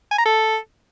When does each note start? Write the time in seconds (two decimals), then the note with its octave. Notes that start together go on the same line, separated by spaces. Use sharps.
0.11 G#5
0.19 A#5
0.26 A4